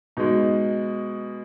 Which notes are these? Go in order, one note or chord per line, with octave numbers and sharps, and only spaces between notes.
B2 G#3 D#4